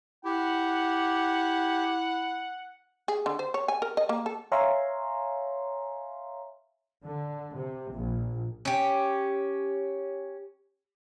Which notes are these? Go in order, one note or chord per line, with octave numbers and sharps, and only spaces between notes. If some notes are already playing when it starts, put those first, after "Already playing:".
E4 G4 F#5
G#4
D3
C5
C#5
G#5
A#4
D#5
A#3
A4
C#5 E5 F5 G#5 A#5 C6
D3
C3
A#1
C#4 G4